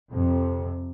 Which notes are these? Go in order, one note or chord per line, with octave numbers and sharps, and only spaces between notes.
F2 C3